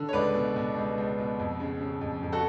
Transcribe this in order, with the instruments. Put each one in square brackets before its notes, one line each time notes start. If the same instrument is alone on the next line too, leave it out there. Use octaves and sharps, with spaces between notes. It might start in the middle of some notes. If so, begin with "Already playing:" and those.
Already playing: [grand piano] D3
C#5
C#2 B4 D5
B2
B2
C#2
C#2
B2
F2
C#3
C#3
F2
F2
F#4 A4